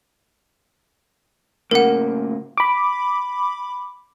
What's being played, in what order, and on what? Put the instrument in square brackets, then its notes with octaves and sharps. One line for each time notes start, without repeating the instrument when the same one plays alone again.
[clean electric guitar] A2 C#3 A#3 [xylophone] A#4 F#5
[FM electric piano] B5 D6